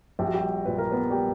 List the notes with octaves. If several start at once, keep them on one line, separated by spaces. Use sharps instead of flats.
A#1 G4
F#4
G3 G4
A#2 F#3 B4
A#4
B3 B4
G3 G4